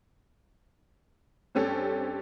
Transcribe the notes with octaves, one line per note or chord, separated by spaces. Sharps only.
G2 C4 C#4 G4 A4